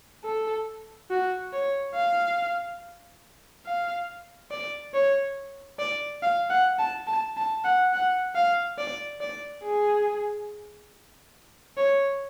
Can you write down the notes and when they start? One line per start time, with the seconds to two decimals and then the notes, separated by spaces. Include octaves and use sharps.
0.25 A4
1.10 F#4
1.53 C#5
1.95 F5
3.66 F5
4.51 D5
4.94 C#5
5.79 D5
6.22 F5
6.50 F#5
6.79 A5
7.07 A5
7.37 A5
7.64 F#5
7.93 F#5
8.35 F5
8.78 D5
9.21 D5
9.64 G#4
11.77 C#5